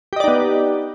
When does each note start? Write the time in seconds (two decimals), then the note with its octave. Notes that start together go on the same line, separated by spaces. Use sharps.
0.13 G4
0.16 D#5
0.20 D5
0.24 D#4
0.28 B3